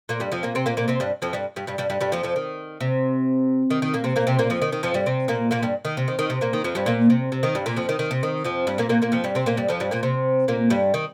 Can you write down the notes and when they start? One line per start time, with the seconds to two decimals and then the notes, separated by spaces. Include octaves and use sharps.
0.09 A#2 A#3
0.20 G2 G3
0.32 F2 F3
0.43 A#2 A#3
0.55 C3 C4
0.66 A#2 A#3
0.77 A#2 A#3
0.88 C3 C4
1.00 G2 G3
1.22 F2 F3
1.33 G2 G3
1.56 G2 G3
1.67 G2 G3
1.78 G2 G3
1.90 G2 G3
2.01 G2 G3
2.12 F2 F3
2.23 F2 F3
2.36 D#3
2.81 C3
3.70 D#3
3.82 D#3
3.94 A#2 A#3
4.04 C3 C4
4.16 A#2 A#3
4.27 C3 C4
4.39 A#2 A#3
4.50 F2 F3
4.62 D#3
4.72 D#3
4.83 F2 F3
4.94 G2 G3
5.06 C3 C4
5.28 A#2 A#3
5.51 A#2 A#3
5.63 G2 G3
5.85 D#3
5.97 C3
6.08 D#3
6.19 D#3
6.30 C3
6.41 A#2 A#3
6.53 D#3
6.64 F2 F3
6.75 G2 G3
6.86 A#2 A#3
7.10 C3
7.32 C3
7.43 D#3
7.55 G2 G3
7.66 A#2 A#3
7.76 F2 F3
7.89 D#3
7.99 D#3
8.11 C3
8.23 D#3
8.44 F2 F3
8.67 G2 G3
8.78 A#2 A#3
8.89 A#2 A#3
9.02 A#2 A#3
9.12 F2 F3
9.24 G2 G3
9.35 C3 C4
9.46 A#2 A#3
9.57 G2 G3
9.68 F2 F3
9.80 G2 G3
9.91 A#2 A#3
10.03 C3 C4
10.48 A#2 A#3
10.70 G2 G3
10.94 D#3